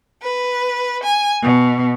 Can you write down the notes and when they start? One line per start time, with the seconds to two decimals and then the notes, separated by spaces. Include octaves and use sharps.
0.23 B4
1.04 G#5
1.42 B2